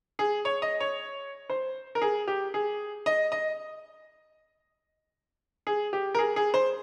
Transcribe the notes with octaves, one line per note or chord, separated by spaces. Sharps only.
G#4
C#5
D#5
C#5
C5
A#4
G#4
G4
G#4
D#5
D#5
G#4
G4
A#4
G#4
G#4
C5